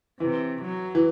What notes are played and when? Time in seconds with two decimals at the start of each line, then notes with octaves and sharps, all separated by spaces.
0.20 C3 E3
0.62 F#3
0.95 E3